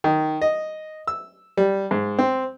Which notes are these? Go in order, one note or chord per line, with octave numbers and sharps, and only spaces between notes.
D#3
D#5
E6
G3
G#2
C4